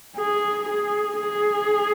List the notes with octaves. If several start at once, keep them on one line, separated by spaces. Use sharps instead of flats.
G#4
G#4
G#4